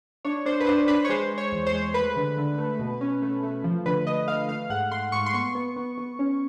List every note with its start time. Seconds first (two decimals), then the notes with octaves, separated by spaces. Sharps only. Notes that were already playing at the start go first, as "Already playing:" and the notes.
0.25 D4 C#5
0.46 D4 C5
0.60 B4
0.67 D4 C5
0.88 D4 B4
1.05 C#5
1.09 G#3 C5
1.31 G#3
1.38 C#5
1.52 E2
1.67 C5
1.73 G#3
1.94 A3 B4
2.16 D3
2.37 D3
2.58 A3
2.79 B2
3.01 C#4
3.22 A3
3.43 A3
3.64 F3
3.86 D3 B4
4.07 A3 D#5
4.27 A3 F5
4.49 A3 F5
4.70 G#2 F#5
4.91 A3 C6
5.12 G#2 C#6
5.26 C6
5.34 B3 C#6
5.55 B3
5.76 B3
5.98 B3
6.19 C#4